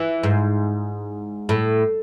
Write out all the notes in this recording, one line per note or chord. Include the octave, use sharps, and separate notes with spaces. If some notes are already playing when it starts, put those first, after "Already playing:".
Already playing: E3
G#2
A2